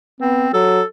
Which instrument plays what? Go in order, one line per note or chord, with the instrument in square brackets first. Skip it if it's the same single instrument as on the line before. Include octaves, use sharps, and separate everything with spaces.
[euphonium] B3 [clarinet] C4
[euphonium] F#3 [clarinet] A4